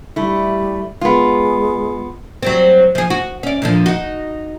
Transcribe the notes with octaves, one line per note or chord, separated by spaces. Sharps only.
G3 A3 E4
G#3 B3 F4
F#3 G3 C4
F3 G#4
F#4
C#4 D5
A#2 D3 F3
D#4 F#4